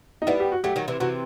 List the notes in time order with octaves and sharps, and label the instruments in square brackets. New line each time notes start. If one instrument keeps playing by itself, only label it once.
[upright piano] D#4
[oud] G3 B3 [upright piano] E4
[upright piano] G4
F#4
[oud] F#3 A3 [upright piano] G4
[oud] D#3 F#3
C3 E3
[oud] C3 E3 [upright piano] F#4